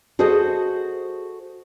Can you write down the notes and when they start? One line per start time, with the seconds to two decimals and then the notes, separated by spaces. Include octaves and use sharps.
0.19 F#4 G#4 A4 C5 D#5